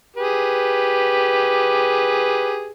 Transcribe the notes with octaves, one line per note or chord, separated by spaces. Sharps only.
G4 G#4 B4